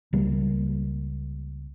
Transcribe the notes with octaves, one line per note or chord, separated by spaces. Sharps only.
C#2 G3 A#3